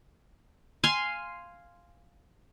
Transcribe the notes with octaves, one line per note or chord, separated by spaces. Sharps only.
F5 G#5 C6